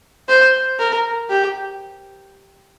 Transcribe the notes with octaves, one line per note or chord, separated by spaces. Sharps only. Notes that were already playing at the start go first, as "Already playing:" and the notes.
C5
A#4
G4